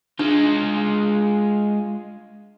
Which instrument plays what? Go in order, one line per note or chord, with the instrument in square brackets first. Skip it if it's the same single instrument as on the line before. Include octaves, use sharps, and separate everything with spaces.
[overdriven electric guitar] G#3 F4 [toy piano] D4